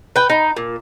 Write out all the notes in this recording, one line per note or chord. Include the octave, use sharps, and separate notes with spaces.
B4 G5
D#4
A#2